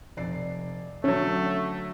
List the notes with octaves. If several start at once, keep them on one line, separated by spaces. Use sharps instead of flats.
F1 D5 C7
D3 F#3 A3 C#4 C#5